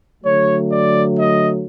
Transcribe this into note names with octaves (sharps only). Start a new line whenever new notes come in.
D3 F#3 A3 C#5
D5
D#5